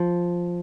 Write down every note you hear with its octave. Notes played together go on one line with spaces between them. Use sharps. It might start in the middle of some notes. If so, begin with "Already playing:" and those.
Already playing: F3